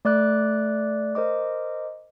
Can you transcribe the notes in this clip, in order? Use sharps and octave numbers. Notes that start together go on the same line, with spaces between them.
A3 D5 D6 F#6
A#4 C5 D#5 D6